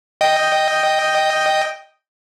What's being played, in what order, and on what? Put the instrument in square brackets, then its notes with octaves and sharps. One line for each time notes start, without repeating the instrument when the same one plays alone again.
[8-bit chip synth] D#5 G5